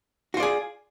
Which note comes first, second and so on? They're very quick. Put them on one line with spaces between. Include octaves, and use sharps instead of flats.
F#4 F4 D5 G#4